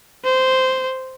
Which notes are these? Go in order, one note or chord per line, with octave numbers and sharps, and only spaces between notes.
C5